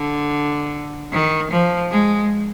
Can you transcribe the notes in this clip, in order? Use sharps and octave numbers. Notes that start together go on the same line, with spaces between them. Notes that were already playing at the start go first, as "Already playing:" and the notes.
Already playing: D3
D#3
F3
G#3